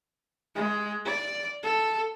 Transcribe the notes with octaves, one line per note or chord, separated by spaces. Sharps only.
G#3
D5
A4